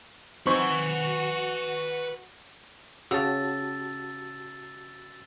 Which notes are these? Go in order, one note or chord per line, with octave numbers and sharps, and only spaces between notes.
C4 D#4 F#4 B4 C5 G#5 C#6
C#3 F#4 G4 A5 E6 A6